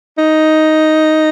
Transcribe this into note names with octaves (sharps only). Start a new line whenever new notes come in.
D#4